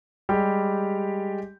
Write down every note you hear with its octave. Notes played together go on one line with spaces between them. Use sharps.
G3 G#3 G4